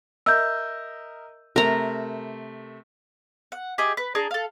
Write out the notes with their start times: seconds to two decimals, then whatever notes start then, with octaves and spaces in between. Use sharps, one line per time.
0.26 A#4 D#5 E5 E6 G6
1.56 C3 A3 A#4 A#5
3.52 F#5
3.78 G4 G#4 D#5 E5
3.97 B4
4.15 D4 G#4 A#5
4.31 A4 F5